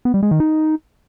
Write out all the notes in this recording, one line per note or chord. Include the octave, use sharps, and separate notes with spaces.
B3
G3
G#3
D#3
D#4